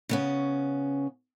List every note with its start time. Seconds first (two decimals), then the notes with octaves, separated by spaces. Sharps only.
0.09 C#3 B3 C#4